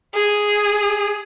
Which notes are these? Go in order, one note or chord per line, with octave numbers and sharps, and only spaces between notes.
G#4